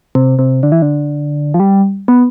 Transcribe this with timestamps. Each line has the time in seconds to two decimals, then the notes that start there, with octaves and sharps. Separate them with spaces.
0.15 C3
0.39 C3
0.63 D3
0.72 E3
0.82 D3
1.54 F3
1.60 G3
2.08 B3